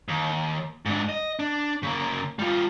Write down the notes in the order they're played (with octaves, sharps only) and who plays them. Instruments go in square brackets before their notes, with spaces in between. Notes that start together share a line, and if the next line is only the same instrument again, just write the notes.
[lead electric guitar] D#2
G#2 D4
D#5
D4
C#3 A#3
G3 F4